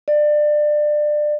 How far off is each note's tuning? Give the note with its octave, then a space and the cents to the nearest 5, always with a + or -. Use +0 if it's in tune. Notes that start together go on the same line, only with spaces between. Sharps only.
D5 +25